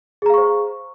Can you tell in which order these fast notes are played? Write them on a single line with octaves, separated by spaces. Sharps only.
G#4 A#5 F5 C#6 C5